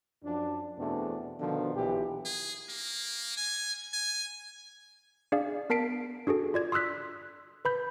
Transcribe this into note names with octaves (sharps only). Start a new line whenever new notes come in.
F#2 F3 D4
E2 B2 A3 C4 D4
B2 D3 D#3 F3
B1 A#2 E3 G4
G#4
A#3
G#5
G#5
D4 G#4 D5 F5
B3 A#4 A5 B6 C7 D7
D4 F#4 G#4 A4
F4 D5 G#6
C6 D#6 E6 F#6 B6
B4 B5 G6